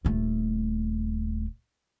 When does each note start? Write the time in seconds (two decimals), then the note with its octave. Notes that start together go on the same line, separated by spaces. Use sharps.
0.05 D#1 A3